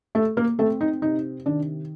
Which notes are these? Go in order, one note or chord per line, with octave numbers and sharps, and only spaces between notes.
A3 A4
A#3 A#4
A3 C4 A4
D#4
C3 D#4
D#3 D4